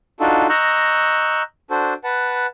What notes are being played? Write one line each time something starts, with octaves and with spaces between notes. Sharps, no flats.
D4 D#4 F4 F#4 A4
D#5 A#5 C#6 E6 F#6 G6
D4 F#4 A4 C5
B4 F#5 A5